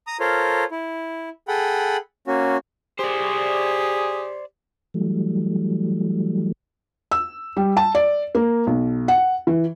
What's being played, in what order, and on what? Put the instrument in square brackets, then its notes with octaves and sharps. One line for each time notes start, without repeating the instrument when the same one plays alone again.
[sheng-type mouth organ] A#5 D#6
F4 A4 A#4 C5 C#5
E4
G#4 A4 F#5 G5 B5
A#3 C#4 F#4
[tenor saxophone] G4 [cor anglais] G#4 [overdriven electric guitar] C5 D5
[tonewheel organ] E3 F#3 G3 A3
[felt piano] E6
G3
A5
D5
A#3
B1
F#5
E3